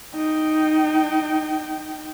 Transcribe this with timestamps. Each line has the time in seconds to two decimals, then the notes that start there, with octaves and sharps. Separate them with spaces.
0.15 D#4 G5